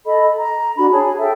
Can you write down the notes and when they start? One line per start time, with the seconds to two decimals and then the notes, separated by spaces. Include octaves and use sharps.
0.06 A4 D#5 B5
0.36 A#5
0.77 D4 F#4 B5
0.92 G#4 C#5 G#5 A5
1.20 A4 C#5 E5 G5